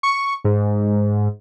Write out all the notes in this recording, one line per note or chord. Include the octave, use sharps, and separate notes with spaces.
C#6
G#2